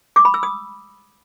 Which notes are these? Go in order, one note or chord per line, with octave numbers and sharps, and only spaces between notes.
D6
B5
E6
D#6